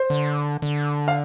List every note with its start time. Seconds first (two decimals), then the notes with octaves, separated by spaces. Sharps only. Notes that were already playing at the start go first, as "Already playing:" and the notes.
Already playing: C5
0.10 D3
0.62 D3
1.08 F5